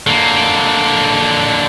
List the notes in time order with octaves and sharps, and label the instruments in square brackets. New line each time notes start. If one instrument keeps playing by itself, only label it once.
[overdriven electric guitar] D3 A#3